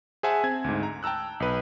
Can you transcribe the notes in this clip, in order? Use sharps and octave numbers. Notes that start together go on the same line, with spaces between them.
G#4 C5 E5 F#5 G#5 A5
C4 G#6
D2 G#2
A#5
G5 A5 A#5 E6 F#6
B1 B4